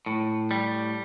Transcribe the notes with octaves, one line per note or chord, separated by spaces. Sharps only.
A2
G3